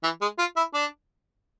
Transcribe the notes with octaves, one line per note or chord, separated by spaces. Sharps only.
E3
G#3
F4
E4
D4